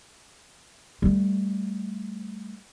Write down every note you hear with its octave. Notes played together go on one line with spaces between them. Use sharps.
G3 A3